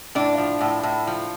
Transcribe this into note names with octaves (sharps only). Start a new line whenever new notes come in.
A2 D4
F3
A2
A2
F3